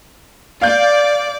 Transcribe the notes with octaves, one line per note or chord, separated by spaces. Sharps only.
D5 F5 G6